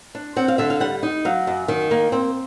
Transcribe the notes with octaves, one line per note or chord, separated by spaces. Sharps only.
D4
C4 F#5
F5
D3 E5
F5
G3 F#5
D#4
F#3 F5
F#2
D#3
A#3
C4